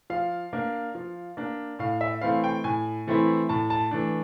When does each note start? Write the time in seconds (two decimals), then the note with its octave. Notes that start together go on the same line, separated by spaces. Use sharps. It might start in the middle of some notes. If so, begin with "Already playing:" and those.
0.10 F3 F5
0.53 A#3 D4
0.95 F3
1.37 A#3 D4
1.79 A2 F5
2.01 E5
2.21 E3 A3 C4 E4 F5
2.44 G5
2.64 A2 G#5
3.07 E3 A3 C4 E4
3.49 A2 A5
3.70 A5
3.91 E3 A3 D4